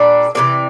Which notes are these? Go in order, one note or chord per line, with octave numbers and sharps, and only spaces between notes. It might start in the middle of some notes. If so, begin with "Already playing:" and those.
Already playing: A#2 G3 D4 D5
C3 E3 G3 A#3 D5